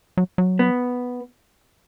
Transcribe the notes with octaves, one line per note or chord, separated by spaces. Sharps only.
F#3
F#3
B3